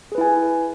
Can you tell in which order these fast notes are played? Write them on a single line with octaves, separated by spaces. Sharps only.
G#4 B4 E4 G#5